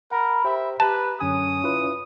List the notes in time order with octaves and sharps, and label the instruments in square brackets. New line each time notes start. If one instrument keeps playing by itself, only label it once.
[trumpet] A#4 [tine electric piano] F#5 [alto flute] B5
[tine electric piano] G4 C5 G5 [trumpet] E5
[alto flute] G4 [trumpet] B4 [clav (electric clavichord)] A5 [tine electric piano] A#5
[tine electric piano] F#2 D3 G#5 [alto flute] C#4 [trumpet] D#6
[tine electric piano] E4 F4 B4